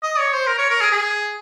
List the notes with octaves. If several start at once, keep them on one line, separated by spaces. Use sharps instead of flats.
D#5
C#5
C5
A#4
C#5
A#4
G#4
G#4